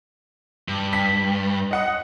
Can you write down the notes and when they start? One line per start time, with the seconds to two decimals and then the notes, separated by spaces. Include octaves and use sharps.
0.68 G2
0.93 B6
1.71 D#5 F#5 D#6